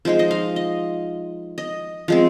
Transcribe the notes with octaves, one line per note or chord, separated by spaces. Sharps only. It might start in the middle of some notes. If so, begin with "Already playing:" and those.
F3 G#3 D#4 C5
D#5
F5
D#5
D#5
F3 G#3 C4